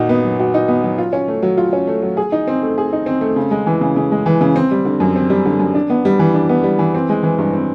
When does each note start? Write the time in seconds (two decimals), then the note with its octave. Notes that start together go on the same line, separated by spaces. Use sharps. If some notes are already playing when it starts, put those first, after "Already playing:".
Already playing: A#2 D#4 F#4
0.09 B3
0.24 F#3
0.40 F#4
0.54 D#4
0.68 B3
0.84 F#3
0.98 F4
1.13 C#4
1.28 A3
1.43 F#3
1.58 F4
1.73 C#4
1.87 A3
2.03 F#3
2.17 G#4
2.32 D#4
2.47 C4
2.63 A3
2.78 G#4
2.93 D#4
3.06 C4
3.21 A3
3.36 C#3
3.51 G#3
3.66 E3
3.81 C#3
3.96 C#3
4.11 G#3
4.26 E3
4.41 C#3
4.56 C4
4.71 G3
4.85 D3
5.00 F#2
5.16 C4
5.30 G3
5.46 D3
5.60 F#2
5.74 D4
5.90 B3
6.05 G3
6.19 E3
6.34 D4
6.49 B3
6.64 G3
6.79 E3
6.94 C4
7.09 G#3
7.23 E3
7.38 G2
7.53 C4